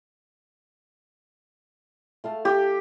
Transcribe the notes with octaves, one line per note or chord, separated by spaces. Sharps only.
A3 F5 A5
G4